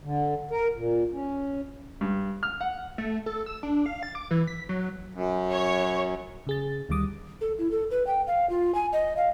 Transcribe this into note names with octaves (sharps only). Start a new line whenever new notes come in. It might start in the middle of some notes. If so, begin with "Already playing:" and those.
D3
A#4
A#2
C#4
G2
F6
F#5
A3
A4
E6
D4
F5
A6
D6
E3
B6
F#3
F#2
C#5
C#3 G#4 A6
D2 D#3 G3 D6 D#6
A4
E4
A4
B4
G5
F5
F4
G#5
D#5
F5